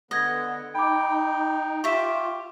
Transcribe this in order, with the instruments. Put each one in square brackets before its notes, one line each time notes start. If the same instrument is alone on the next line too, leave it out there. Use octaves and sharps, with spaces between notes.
[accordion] D3 B3 [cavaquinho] D#5 F#5 [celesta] D#6 G#6 A#6
[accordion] D#4 [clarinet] G5 [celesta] B5 D6
[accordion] F4 [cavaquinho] G4 E5 [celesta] C#6 B6 E7